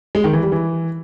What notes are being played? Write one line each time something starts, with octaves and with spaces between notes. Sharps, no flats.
G#3
D#3
E3
G3
E3